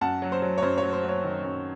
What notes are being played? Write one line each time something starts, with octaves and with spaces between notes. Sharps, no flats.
F#2 F#5 A5
F#3
C5
F#3
C#5
F#2 C5
F#3 C#5
C5
F#3
C#5
D#3
F#2